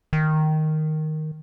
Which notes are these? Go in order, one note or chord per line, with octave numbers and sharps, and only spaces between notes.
D#3